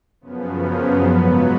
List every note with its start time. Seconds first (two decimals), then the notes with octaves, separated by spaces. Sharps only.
0.21 F#2 C#3 F3 B3
1.00 G#2 F#3 B3